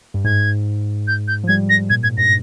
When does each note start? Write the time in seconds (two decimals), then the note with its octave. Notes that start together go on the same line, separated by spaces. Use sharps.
0.14 G2
0.24 G#2 G#6
1.08 G6
1.28 G6
1.44 F3
1.48 G3 G#6
1.69 A#6
1.90 A#2 G#6
2.03 G#2 G#6
2.17 G2 A#6